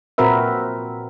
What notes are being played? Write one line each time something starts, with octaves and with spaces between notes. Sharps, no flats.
A#2 C4 F#4 A#4 B4 E5